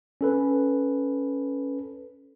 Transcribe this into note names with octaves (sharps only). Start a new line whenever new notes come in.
C#4 A4 B4